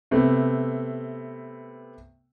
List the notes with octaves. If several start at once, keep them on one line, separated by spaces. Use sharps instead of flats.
C3 A3 B3